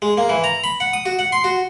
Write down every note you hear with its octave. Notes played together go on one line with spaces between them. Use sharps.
G#3
A#3
E3
A#5
B5
F#5
D#6
F#4
F#5
C6
F#4